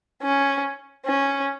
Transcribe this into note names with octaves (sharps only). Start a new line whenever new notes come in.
C#4
C#4